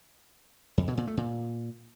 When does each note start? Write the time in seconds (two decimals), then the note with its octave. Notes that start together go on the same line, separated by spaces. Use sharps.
0.78 F2
0.88 B2
0.97 A#2
1.07 A3
1.17 A#2